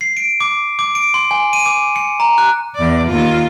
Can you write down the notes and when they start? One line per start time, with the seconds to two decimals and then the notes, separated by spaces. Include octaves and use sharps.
0.01 C7
0.17 D7
0.41 D6
0.79 D6
0.95 D7
1.14 C6
1.31 G#5
1.53 D#7
1.66 D6
1.96 C#7
2.20 A#5
2.38 F#6
2.75 E2 D5
3.07 D#2 F4